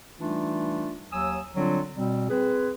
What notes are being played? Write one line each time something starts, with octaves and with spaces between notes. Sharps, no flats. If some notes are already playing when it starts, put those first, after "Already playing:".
E3 G3 A3 D4 D#4 F4
D#2 F#3 G#5 D#6 E6
D3 F#3 G3 C4 D4 F4
B2 G3 C4
C4 G#4 B4